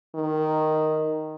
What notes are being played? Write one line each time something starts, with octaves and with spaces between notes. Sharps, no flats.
D#3